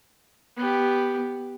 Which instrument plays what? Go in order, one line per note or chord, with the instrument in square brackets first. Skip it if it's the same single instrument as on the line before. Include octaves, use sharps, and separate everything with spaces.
[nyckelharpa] B3 G4